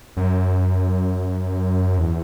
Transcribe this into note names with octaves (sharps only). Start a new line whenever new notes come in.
F#2
E2